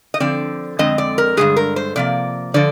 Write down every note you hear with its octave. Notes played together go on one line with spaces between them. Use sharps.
D#5
D3 F3 C4 D5
F2 D3 G#3 C4 D#5
D5
A#4
G2 D3 F3 G#3 G#4
A#4
C5
C3 F3 A#3 D5
D3 F3 D5